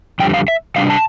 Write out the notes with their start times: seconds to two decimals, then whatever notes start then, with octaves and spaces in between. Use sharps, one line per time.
0.19 F2 D3 G3 G5
0.34 F5
0.48 E5
0.76 C3 G3 D4 F5
0.90 A5